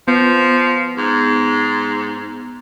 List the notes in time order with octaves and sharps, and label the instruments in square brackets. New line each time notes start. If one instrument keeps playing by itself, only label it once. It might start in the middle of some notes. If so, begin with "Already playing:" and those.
[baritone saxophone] F3 [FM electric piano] B3
[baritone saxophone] G#2